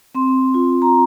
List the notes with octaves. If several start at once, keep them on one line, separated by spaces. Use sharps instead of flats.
C4 C6
F4
A#5